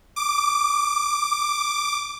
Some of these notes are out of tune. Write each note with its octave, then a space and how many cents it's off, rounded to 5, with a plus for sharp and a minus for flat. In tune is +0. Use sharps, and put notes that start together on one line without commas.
D6 +15